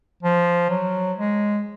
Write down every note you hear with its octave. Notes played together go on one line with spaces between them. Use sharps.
F3
F#3
G#3